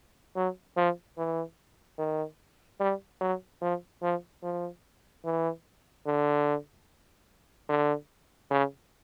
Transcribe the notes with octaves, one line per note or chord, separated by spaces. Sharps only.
F#3
F3
E3
D#3
G3
F#3
F3
F3
F3
E3
D3
D3
C#3